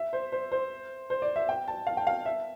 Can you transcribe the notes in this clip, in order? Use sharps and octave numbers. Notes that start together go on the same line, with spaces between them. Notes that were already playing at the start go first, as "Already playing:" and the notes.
Already playing: E5
C5
C5
C5
C5
D5
E5
G5
A5
F5
G5
F5
E5